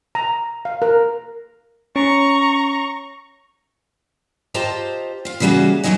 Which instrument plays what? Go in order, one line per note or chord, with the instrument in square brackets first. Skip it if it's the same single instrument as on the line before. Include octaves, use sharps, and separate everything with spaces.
[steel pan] A#5
F5
A#4
[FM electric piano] C#4 [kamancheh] A#5 C#6
[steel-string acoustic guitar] F4 G4 C5 D#5 A5 A#5
F4 F5
C#3 E3 G3 A#3 F#4 G#4
E2 C3 F#3 D#4 D#5 G#5